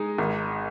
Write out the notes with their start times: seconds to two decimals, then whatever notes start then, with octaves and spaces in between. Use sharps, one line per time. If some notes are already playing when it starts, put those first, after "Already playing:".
Already playing: G#3 D#4
0.18 G#1